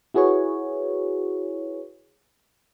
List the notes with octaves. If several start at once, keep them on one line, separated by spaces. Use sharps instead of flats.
E4 F#4 G#4 B4 C#5